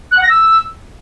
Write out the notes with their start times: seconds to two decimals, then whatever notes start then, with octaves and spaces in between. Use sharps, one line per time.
0.11 F#6
0.17 F#5
0.23 A#6
0.29 E6